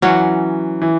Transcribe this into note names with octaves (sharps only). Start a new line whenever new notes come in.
E3 F#3 C#4 F#4
E3